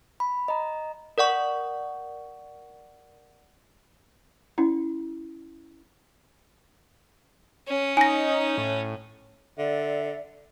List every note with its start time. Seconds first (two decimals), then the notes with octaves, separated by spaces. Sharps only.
0.20 B5
0.48 D#5 A#5
1.18 A#4 D5 F#5 C#6
4.58 C#4 E4
7.68 C#4
7.97 D#4 G#5 A#6
8.58 A2
9.58 D3 D5 E5